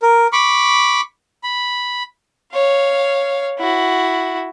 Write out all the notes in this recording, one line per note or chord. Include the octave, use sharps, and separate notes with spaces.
A#4
B5 C#6 D6
B5
C#5 F5
E4 F#4